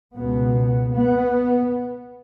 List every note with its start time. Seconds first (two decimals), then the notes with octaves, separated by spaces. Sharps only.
0.14 C#2 B2 B3
0.92 B3